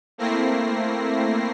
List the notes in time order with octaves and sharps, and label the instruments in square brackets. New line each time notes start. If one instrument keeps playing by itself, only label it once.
[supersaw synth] A3 A#3 C4 E4 A#6 C7